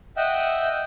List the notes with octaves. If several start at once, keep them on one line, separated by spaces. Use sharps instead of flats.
D#5 E5 F#5 G5 E6